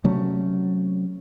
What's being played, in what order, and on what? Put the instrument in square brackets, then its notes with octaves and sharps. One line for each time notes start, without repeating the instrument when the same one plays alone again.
[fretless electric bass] C3 F#3 A3 C#4